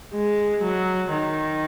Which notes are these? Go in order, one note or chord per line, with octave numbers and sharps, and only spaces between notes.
G#3
F#3
D#3